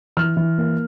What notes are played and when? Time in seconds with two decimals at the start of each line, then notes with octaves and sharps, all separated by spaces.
0.17 E3 F6
0.37 E3
0.58 A#3